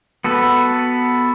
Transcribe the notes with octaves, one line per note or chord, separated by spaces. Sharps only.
B3 F#4 A4 B4